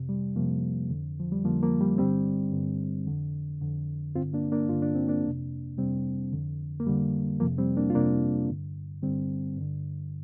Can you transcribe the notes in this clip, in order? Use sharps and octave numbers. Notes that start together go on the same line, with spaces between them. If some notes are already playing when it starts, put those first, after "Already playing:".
Already playing: F2 C3
G3
F2 C3 F3 A#3
F2 D3
F3
G3
F2 D3 F3 A#3
F3 A#3
G3
G2 D3 G3 C4
G2 D3
F2 D3
F2 D3
G2 D3 C4 F4
A#3 D4
A#3 D4
G2 D3 F4
D4
C4
A#3 D4
F2 C3
F2 C3 G3 C4
F2 D3
A#3
F2 D3 G3
F2 C3 F3 A#3
G3 C4
A#3 D4
F4
F2 C3 A#3 D4
G2 D3
G2 D3 G3 C4
G2 D3